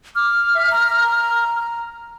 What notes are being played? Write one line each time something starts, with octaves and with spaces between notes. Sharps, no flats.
D6 F6
E5
A#5